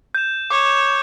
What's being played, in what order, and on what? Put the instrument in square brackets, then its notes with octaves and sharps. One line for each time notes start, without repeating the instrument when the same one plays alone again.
[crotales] G6 E7
[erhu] C#5 [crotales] D6